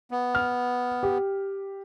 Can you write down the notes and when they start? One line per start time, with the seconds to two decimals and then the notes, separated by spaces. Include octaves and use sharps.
0.11 B3
0.35 F6
1.03 G4